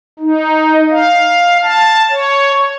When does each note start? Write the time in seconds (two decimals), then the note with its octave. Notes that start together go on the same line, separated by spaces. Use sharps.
0.20 D#4
0.91 F5
1.63 A5
2.10 C#5